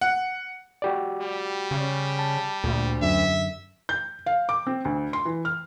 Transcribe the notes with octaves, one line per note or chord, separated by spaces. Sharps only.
F#5
F#4 G4 D5
G3
C#3
A5
D2 A#2
F#2 D3 E5
G6
F5
D6
C4
D2
C6
E3
F6